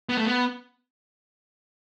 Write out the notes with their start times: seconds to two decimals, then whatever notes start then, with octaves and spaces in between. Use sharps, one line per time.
0.09 B3
0.17 A3
0.26 B3